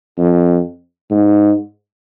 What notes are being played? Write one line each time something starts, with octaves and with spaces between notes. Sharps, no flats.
F2
G#2